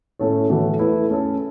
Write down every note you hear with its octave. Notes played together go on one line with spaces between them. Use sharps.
A2 A3 C#4 A4 C#5
A2 E3 A3 F#4
A3 E4 B4
A3 C#4 A4